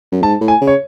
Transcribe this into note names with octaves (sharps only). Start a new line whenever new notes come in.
F#2
G#2 A5
A2
G#5
C#3
C#5